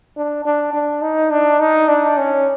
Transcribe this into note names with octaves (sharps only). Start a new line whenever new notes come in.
D4
D4
D4
D#4
D4
D#4
D4
C#4